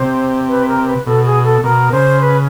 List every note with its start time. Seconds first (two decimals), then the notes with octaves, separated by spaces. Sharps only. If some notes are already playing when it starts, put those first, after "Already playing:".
Already playing: C3 C5
0.48 B4
0.68 A#4
0.87 B4
1.06 B2 A4
1.25 G#4
1.44 A4
1.63 B2 A#4
1.92 C#3 C5
2.21 B4